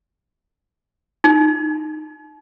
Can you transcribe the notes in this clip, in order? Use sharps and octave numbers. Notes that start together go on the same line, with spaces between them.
D#4